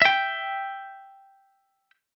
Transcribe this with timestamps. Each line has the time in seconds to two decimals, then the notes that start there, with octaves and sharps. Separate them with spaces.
0.02 E5 G5